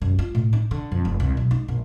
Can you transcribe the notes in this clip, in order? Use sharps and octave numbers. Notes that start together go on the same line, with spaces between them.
F#2
F4
A2
D#4
D3
F2
F1
C2
B1
D#4
A#1